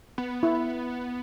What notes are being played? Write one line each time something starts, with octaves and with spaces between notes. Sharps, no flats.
B3
E4